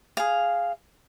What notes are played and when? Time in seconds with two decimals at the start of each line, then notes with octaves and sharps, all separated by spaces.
0.17 G#4 F5